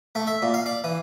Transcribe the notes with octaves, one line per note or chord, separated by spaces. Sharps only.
A3
E5
A#2
F5
D5
E3